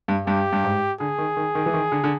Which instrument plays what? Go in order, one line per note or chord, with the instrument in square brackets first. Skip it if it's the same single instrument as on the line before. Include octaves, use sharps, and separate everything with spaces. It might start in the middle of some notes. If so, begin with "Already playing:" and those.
[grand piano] G2
[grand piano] G2 [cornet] G4
[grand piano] G2
G#2
[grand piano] D3 [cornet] G#4
[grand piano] D#3
D#3
D#3
E3
D#3
D3
D3